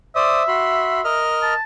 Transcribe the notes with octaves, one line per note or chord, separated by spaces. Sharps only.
C5 D5 E5 D#6
F#4 B5 C6
A#4 D#5 F6
A5